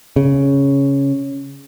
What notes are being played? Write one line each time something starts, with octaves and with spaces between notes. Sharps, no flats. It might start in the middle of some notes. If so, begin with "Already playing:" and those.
C#3